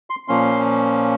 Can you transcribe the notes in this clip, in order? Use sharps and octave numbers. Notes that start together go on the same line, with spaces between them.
C6
A#2 F3 A#3 C#4 C6